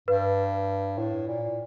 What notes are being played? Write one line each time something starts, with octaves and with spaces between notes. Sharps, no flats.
G2 B4
A2
A#2